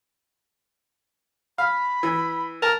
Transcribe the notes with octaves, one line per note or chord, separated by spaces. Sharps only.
F5 B5
E3
A#4 A5